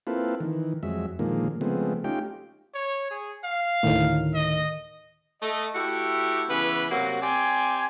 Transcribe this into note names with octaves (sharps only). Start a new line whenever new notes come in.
A#3 C4 E4 F4 A4 B4
D#3 E3
F2 F#3 G#3 E5
A#2 D3 D#3 F3 G#3 A#3
C#3 F3 G#3 A3 B3 C4
A3 C#4 D#4 F4 G4 G5
C#5
G#4
F5
D2 A2 D#3
D#5
A3 D#5
A3 E4 F#4 G4
C#3 E3 B3 E4 B4
C3 F#3 A#3 F#4
C4 G4 D5 G#5